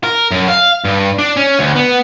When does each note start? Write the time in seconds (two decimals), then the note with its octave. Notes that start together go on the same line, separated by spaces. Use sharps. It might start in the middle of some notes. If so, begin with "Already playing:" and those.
0.04 A#4
0.31 F#2
0.48 F5
0.85 G2
1.19 D4
1.37 C#4
1.59 D2
1.75 B3